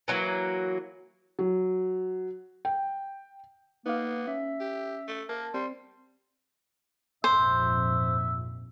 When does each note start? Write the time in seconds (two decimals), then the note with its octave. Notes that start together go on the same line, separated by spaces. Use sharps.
0.08 E3 F#3 A#3
1.39 F#3
2.65 G5
3.86 A#3 B3 D#4 F5
4.27 C#4 E5
4.60 G4
5.08 A3
5.29 A#3 A5
5.54 G3 C4 C6
7.24 A#1 F2 G#2 C5 E5